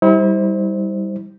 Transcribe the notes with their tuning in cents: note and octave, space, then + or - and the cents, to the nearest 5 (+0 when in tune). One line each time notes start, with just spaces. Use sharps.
G3 +0 E4 -40 C5 +0